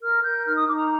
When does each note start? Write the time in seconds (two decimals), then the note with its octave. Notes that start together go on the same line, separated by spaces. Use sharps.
0.02 A#4 F6
0.24 A#4 G6
0.45 D#4 F6
0.56 D#6
0.67 D#4 D6
0.77 A#5